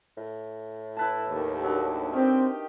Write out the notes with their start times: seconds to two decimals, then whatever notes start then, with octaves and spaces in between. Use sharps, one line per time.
0.17 A2
0.97 E4 B4 A5
1.27 D#2
1.63 F#3 D4
2.13 D#3 C4 G4